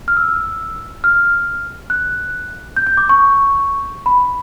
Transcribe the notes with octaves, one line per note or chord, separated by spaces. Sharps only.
F6
E6
F6
F#6
G6
G6
D6
C#6
B5